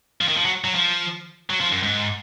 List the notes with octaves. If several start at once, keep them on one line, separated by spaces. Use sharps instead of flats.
F3
D#3
F3
F#3
F#3
F3
F#3
F3
F#2
G#2